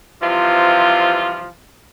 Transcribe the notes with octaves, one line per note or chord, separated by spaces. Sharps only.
C3 E3 F3 G3 F4